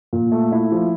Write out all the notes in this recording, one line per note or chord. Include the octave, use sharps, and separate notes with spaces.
A#2
A3
E4
F3